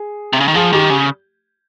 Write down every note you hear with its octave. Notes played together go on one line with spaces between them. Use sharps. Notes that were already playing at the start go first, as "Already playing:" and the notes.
Already playing: G#4
C3
C#3
D#3
F3 G#4
D#3 G4
C#3